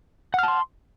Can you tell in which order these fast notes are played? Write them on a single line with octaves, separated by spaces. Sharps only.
F#5 F6 A5 C6